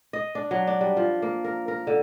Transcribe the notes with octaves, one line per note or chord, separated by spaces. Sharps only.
D#5
D4
F#3
D4
G3
F3
A#3
A#4
A#4
D3